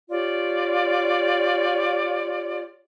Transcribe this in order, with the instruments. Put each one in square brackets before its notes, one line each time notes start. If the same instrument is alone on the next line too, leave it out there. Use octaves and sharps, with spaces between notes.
[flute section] F4 G4 C#5 D5